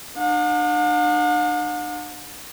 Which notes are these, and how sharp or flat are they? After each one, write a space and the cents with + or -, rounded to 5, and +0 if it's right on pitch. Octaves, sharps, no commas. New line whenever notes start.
D4 +40 F#5 -45